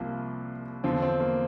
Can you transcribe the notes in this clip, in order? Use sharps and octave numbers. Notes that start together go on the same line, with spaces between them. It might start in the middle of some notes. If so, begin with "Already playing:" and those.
Already playing: C2 C3 F3 A#3
E2 D3 F3 C4
C4
A#3